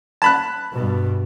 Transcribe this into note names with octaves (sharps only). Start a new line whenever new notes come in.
A5 B5 F#6
G2 B2